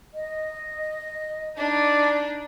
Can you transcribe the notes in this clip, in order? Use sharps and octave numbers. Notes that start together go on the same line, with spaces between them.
D#5
D4 D#4 D5